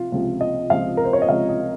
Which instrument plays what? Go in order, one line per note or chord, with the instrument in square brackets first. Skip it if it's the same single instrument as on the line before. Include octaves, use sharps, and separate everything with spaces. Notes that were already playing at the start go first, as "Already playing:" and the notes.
Already playing: [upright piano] C3 F3 F4
C#2 C3 F3 F4
D#5
C#2 C3 F3 F5
A#4
C5
C#5
D#5
C#2 C3 F3 F5
D#5